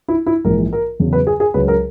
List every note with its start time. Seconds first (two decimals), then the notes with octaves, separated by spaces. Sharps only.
0.08 E4
0.26 E4
0.45 A#1 G#2 E3 A#4
0.73 A#4
1.00 E2 C#3 F#3
1.13 B4
1.27 G#4
1.40 G#4
1.54 C#2 C#3 F#3 B4
1.68 A#4